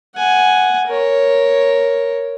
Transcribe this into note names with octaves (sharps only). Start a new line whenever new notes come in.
F#5 G#5
A#4 C#5